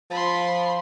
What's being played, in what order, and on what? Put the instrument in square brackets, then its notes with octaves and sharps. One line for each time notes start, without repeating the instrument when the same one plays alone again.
[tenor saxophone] F3 [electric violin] B5 C6